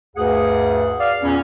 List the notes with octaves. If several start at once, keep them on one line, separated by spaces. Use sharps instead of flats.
D2 G2 G#4 F#5
D5 F5
E2 A#2 C#4